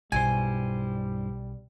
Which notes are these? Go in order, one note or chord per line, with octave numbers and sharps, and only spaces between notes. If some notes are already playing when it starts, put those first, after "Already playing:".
B1 G2 G3 E4 C5 G#5